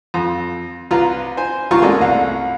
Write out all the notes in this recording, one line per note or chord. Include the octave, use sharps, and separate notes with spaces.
F2
C2 F4 B4 A#5
C5 G#5
C2 A2 F4 A#5 C#6
G#3 A#3 C#4 F#4 A4 D5
C2 F5